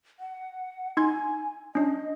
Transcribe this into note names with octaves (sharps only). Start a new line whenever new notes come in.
F#5
D#4 G#5 C6 G#6
C#4 D4 D#5